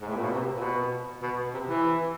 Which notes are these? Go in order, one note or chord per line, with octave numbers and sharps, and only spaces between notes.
G#2
A2
A#2
B2
C3
A#2
B2
B2
C3
E3